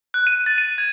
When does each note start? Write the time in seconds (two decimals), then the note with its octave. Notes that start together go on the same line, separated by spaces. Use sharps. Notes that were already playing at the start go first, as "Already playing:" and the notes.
0.14 F#6
0.27 D#7
0.46 A6
0.58 D#7
0.78 G#6